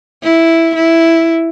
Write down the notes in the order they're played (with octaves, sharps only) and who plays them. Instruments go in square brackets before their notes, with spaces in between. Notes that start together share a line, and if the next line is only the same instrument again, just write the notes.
[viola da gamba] E4
E4